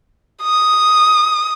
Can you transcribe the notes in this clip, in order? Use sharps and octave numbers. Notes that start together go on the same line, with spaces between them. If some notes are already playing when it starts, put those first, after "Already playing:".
D#6